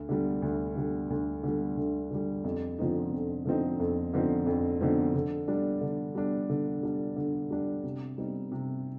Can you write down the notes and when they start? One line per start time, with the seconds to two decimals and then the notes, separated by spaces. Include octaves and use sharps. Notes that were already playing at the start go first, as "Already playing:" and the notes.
Already playing: D2
0.09 D3 G3
0.42 D2
0.76 D3 G3
1.10 D2
1.43 D3 G3
1.77 D2
2.11 D3 G3
2.44 F2
2.79 D3 F3 C4 D#4
3.12 F2
3.45 D3 F3 C4 D#4
3.80 F2
4.14 D3 F3 C4 D#4
4.46 F2
4.81 D3 F3 C4 D#4
5.14 D3
5.48 G3 D4
5.81 D3
6.15 G3 D4
6.50 D3
6.83 G3 D4
7.16 D3
7.51 G3 D4
7.84 C3
8.18 G3 C4 D#4
8.52 C3